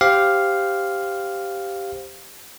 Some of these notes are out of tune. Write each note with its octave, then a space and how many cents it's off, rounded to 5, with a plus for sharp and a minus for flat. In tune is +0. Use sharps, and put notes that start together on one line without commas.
G4 +0 C5 +0 F5 +0